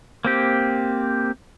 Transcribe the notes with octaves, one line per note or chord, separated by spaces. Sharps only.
A#3 C4 G4